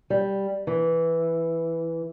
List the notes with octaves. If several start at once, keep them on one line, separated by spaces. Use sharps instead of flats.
G3
E3